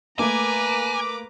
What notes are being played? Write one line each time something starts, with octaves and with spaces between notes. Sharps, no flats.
A3 A#3 B4 G#5 A#5 D6